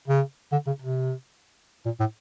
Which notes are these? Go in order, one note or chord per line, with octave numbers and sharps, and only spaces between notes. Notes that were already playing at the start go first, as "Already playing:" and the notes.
C#3
D3
C#3
C3
A#2
A2